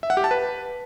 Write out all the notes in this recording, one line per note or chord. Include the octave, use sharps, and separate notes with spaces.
E5
F#5
G4
A5
B4